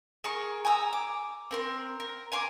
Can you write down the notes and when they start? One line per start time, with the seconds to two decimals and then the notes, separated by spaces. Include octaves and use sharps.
0.24 G#4 A#4 C#6
0.65 G#5 A#5 D#6 E6
0.93 D6
1.51 C4 A#4 C6
2.00 A#4
2.32 G#5 A#5 C6 D6